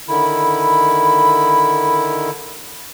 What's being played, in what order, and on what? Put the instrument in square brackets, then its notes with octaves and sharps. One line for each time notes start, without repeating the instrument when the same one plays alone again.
[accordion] D3 D#3 E4 [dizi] B5